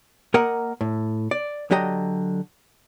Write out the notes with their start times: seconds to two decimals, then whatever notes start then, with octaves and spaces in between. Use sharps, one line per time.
0.34 A#3 A#4 D#5 F#5
0.81 A2
1.31 D5
1.71 D3 F#3 G4 D#5 A#5